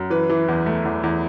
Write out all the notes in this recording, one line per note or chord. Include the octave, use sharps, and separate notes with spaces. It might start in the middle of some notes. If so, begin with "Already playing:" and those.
Already playing: F#2
E3 B4
E3
E2
A3
E2
E2